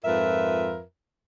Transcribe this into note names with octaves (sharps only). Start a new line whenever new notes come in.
F2 G#2 F4 A#4 B4 E5